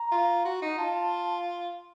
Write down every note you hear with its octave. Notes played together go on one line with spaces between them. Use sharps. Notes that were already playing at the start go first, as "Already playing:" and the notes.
Already playing: A#5
F4
F#4
D#4
F4 A5